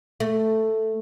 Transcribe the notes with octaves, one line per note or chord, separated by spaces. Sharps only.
A3